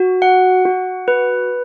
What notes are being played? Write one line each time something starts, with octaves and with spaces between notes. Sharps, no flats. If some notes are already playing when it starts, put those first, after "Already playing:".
Already playing: F#4
F#5
F#4
B4